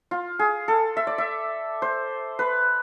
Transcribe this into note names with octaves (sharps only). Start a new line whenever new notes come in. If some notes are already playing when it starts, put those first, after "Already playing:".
F4
G#4
A4
E5
D5
E5
C5
B4